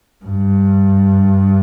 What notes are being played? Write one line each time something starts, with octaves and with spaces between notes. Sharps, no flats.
G2